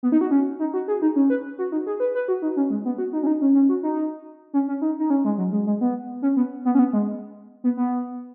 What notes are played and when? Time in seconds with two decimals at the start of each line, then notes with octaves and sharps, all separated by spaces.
0.03 B3
0.12 D#4
0.21 F#4
0.31 C#4
0.59 D#4
0.74 F#4
0.88 G#4
1.02 D#4
1.16 C#4
1.30 B4
1.58 F#4
1.72 D#4
1.87 G#4
2.00 B4
2.15 B4
2.28 F#4
2.42 D#4
2.56 C#4
2.70 G#3
2.85 B3
2.98 F#4
3.13 D#4
3.23 C#4
3.27 D#4
3.41 C#4
3.54 C#4
3.69 F#4
3.83 D#4
4.54 C#4
4.68 C#4
4.82 D#4
4.99 D#4
5.10 C#4
5.25 G#3
5.38 F#3
5.52 G#3
5.67 G#3
5.81 B3
6.22 C#4
6.37 B3
6.65 B3
6.75 C#4
6.79 B3
6.93 G#3
7.64 B3
7.77 B3